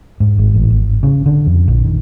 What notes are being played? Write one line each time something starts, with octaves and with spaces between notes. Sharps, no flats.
G#2
G#1
A1
G#1
C#3
D3
F2
A#1
D#3